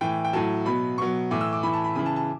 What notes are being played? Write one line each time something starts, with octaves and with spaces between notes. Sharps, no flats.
A2 E3 G5
G5
A2 F#3 A5
B2 F#3 B5
B2 F#3 C#6
A2 E3 D6
E6
D6
A2 E3 B5
A5
B5
C#3 E3 B5
A5
A5